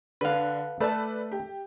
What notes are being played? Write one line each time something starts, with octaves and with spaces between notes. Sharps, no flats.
D3 B4 F5
A3 A4 B4 D5 A5
G4